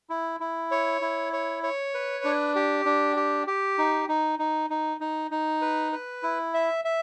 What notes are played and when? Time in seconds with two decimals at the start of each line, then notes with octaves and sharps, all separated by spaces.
0.10 E4
0.40 E4
0.71 C#5
1.01 E4
1.33 C#5
1.63 C#5
1.94 B4
2.24 D4
2.55 G4
2.85 D4
3.16 G4
3.47 G4
3.78 D#4
4.08 D#4
4.39 D#4
4.70 D#4
5.01 D#4
5.31 D#4
5.62 B4
5.92 B4
6.23 E4
6.54 E5
6.85 E5